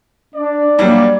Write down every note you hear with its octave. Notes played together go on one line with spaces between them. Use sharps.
D4 D5
F#3 G3 A#3 D4